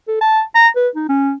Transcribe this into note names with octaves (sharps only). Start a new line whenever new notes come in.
A4
A5
A#5
B4
D#4
C#4